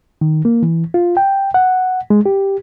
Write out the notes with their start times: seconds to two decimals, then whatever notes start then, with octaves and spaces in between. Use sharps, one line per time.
0.21 D#3
0.45 A#3
0.63 E3
0.94 F4
1.17 G5
1.54 F#5
2.10 G#3
2.26 G4